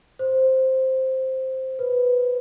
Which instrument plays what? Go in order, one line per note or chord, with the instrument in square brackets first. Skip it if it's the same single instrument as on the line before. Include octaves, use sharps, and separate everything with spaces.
[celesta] C5
B4